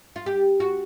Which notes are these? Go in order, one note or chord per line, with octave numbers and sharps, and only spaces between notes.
F4
G4
F#4